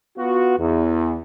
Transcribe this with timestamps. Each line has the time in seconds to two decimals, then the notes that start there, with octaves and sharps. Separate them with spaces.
0.18 B3 F4 F#4
0.59 E2